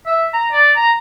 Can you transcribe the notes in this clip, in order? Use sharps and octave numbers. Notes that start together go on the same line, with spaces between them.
E5
A#5
D5
A#5